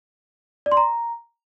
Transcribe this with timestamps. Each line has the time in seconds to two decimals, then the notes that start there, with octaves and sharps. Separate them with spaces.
0.66 D5
0.72 C6
0.77 A#5